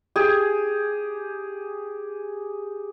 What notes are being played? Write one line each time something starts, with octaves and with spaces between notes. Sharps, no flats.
G4 G#4